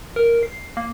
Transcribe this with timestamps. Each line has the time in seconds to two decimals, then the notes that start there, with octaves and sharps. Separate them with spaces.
0.16 A#4
0.43 C7
0.77 A#3